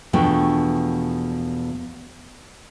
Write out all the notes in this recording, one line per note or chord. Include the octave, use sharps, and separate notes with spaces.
E2 B2 F3 A3 D4 G5